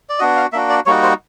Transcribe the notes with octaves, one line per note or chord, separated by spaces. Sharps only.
D5
B3 D4 F#4 D#5
F5
A#3 D4 F#4 E5
D5
G3 A#3 D#4 F#4 C#5
C5